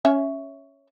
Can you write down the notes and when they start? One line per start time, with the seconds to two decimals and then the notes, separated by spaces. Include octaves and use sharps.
0.05 C#4 C#5 E5